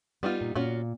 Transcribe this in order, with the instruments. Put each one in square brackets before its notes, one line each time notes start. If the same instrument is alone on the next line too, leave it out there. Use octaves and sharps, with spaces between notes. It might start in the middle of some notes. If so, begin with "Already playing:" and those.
[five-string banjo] G3 D#4 F4 [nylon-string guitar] B3
[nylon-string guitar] A#2
[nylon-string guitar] A#2 [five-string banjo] C#4 F4 F#4